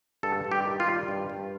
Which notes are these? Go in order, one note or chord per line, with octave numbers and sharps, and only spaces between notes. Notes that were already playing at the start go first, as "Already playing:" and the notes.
G2 A4
G2
G4
D#3
F4
G3
G2
G2